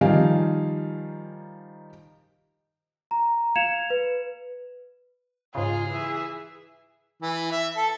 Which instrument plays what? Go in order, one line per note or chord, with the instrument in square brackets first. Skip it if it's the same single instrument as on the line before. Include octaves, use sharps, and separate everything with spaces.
[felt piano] D#3 F3 G3 D#4 F5 G#5
[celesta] A#5
F5 G#6 C#7 E7 F7
B4
[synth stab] G#2 C#3 [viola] F4 [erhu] G#4
[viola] E3 E5
[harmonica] E3
E5
A4